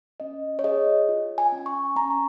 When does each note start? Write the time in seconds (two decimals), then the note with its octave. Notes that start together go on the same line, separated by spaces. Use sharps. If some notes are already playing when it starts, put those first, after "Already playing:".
0.20 C#4 D#5
0.59 C#5
0.64 G#4 D#5
1.09 F4
1.38 G#5
1.52 C#4
1.66 C#6
1.96 C#4 A#5
2.10 C#6